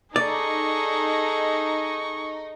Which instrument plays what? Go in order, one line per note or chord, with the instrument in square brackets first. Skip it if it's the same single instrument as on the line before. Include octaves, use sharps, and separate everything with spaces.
[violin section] D#4 [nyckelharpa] G#4 A4 [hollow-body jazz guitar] D5 [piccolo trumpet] C#6